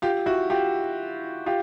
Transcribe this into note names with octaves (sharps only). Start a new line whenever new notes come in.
F4 G4
E4 F#4
F4 G4
F4 G4